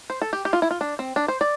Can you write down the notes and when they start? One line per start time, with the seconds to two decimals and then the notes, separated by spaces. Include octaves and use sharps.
0.10 C5
0.22 A4
0.33 G4
0.45 G4
0.53 F4
0.62 E4
0.71 F4
0.81 D4
0.99 C4
1.16 D4
1.28 C5
1.41 D5